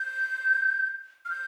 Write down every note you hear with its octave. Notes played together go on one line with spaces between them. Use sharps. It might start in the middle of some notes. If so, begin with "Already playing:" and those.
Already playing: G6
F6
G6